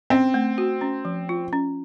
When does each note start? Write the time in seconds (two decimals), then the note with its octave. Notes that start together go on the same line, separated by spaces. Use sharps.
0.10 C4 C#4
0.34 A3
0.58 F#4
0.81 C#4
1.05 F3
1.29 F4
1.53 C#4